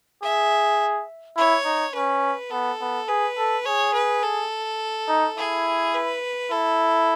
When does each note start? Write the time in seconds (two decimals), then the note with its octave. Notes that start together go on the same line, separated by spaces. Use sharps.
0.23 G#4 E5
1.37 E4 C#5
1.65 D#4
1.94 C#4 B4
2.51 B3 A4
2.81 B3
3.08 G#4 B4
3.38 A4
3.66 G#4 C#5
3.94 B4
4.23 A4
5.08 D#4
5.37 E4 G#4
5.94 B4
6.51 E4 A4